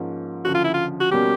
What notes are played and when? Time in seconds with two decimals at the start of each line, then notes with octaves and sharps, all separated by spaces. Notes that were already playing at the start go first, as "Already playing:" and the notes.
Already playing: G#2 F3 A#3 C#4 F4
0.45 D2 C#3 F3 F#4
0.55 F4
0.64 E4
0.74 F4
1.00 F#4
1.11 B2 G3 A#3 C#4 G4